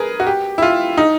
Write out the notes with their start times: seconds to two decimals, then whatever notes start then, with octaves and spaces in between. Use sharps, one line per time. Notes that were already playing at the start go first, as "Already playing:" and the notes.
Already playing: G#4 A#4 B4
0.20 F#4
0.27 G4
0.58 E4
0.62 F4
0.97 D#4